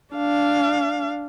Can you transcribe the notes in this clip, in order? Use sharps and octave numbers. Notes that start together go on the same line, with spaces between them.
D4 F5